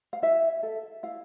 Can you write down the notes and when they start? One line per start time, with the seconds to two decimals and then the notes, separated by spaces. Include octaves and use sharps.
0.13 F5
0.22 E4 E5
0.63 A4
1.03 E4 F5